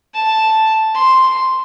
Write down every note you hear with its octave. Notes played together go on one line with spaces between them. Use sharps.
A5
C6